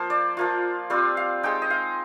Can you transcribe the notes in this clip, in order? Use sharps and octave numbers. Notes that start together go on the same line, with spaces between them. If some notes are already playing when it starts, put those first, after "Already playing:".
Already playing: F3 A#3 F4 C5
D5
F3 A#3 F4
G3 C4 F4 D5
F5
G#3 D#4 G5
D#5
F5